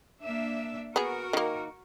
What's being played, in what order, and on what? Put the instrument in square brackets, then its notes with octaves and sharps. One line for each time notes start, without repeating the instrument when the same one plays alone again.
[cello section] A#3 D4 E5
[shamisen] B3 G#4 [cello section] F#4 A#4
[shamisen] D#3 A#3